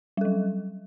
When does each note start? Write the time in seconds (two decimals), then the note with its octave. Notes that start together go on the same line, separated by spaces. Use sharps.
0.17 G3
0.21 A4
0.25 F#3